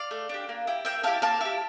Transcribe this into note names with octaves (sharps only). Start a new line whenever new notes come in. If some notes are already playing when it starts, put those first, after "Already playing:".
Already playing: D5 F5
A3
D4 G4
A#3
E4 G4
A#3 E5 G5
E4 G4 F5 A5
A#3 F5 A5
E4 G4